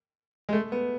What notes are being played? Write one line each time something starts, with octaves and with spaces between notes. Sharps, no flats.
G#3
A3
B3